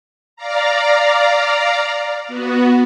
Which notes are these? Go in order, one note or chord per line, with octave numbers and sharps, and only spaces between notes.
D5 F5 A#5
B3 F#4